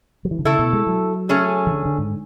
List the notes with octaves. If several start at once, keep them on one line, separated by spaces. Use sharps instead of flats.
F#3
E3
D3
C#3 A3 E4 A4
B2
G#3
F#3
A3 C#4 G#4
E3
D3
D3
G#2